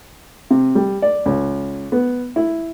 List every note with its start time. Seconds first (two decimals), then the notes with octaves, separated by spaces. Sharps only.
0.51 C3
0.75 G3
1.02 D5
1.26 C#2
1.92 B3
2.36 E4